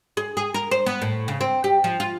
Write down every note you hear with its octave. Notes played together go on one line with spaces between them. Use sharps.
G#4
G#4
A#4
C5
B3
A2
C#3
C4
G4
F3
F4